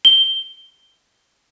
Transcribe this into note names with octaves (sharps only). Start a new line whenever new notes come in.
G7